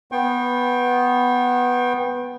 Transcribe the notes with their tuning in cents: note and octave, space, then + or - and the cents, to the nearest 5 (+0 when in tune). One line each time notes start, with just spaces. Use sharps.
B3 +0 G5 +5 C#6 -45